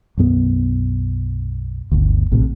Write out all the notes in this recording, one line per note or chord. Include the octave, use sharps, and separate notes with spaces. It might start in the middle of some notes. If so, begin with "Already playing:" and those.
B1 F#2 B3
G1 D2
A#1 A2 C3